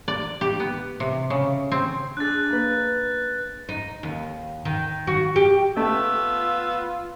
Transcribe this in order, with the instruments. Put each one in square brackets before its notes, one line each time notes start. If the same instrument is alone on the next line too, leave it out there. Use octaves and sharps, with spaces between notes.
[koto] D5
G4
B3
C3
C#3
C4
[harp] D4 G#4 [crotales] F#6 A6
[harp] A#3 B4
[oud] D#4
D#2
D#3
F#4
G4
[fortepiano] A3 [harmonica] B3 [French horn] F4 [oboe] E6